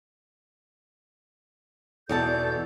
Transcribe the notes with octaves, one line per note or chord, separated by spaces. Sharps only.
E2 B2 A4 D5 A5 G6